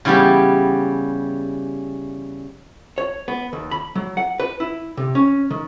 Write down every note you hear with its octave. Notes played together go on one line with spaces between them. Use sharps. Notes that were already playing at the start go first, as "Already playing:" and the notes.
C#3 E3 G3 B3 G4
C#5
B3
D#2
B5
F#3
F#5
B4
E4
C3
C#4
D#3